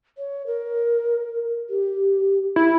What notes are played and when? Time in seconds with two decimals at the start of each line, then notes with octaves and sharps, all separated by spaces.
0.18 C#5
0.47 A#4
1.70 G4
2.56 E4